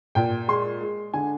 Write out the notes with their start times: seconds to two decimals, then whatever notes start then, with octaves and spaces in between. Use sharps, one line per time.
0.15 A#2 G5
0.48 G#3 C6
0.81 G#3
1.14 D3 G#5